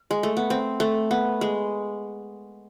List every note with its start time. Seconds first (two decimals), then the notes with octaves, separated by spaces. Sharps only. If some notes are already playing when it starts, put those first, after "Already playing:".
Already playing: F3
0.11 G#3
0.23 A3
0.37 B3
0.50 C4
0.80 A3
1.11 B3
1.41 G#3